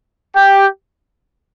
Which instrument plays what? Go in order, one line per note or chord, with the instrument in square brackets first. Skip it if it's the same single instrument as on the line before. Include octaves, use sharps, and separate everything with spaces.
[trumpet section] G4